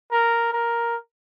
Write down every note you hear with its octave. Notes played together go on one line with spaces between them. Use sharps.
A#4
A#4